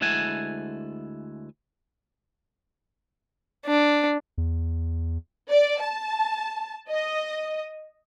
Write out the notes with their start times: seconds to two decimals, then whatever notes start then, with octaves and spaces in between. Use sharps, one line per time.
0.01 D2 G#3 E4 F#5 G#5 A5
3.66 D4
4.38 E2
5.50 D5
5.81 A5
6.89 D#5